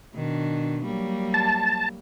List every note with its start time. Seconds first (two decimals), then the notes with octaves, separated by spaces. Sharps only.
0.14 B2 D#3 D4
0.84 F#3 G3 A#3
1.34 A5